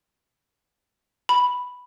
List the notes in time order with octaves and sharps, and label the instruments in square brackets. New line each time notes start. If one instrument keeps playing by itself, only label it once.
[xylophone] B5